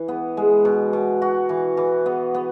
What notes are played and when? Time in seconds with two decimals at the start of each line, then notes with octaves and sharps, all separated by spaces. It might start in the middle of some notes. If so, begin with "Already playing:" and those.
Already playing: E3
0.08 B3
0.37 G#3
0.65 B2
0.93 B2
1.22 F#4
1.49 E3
1.77 E3
2.06 B3
2.34 B3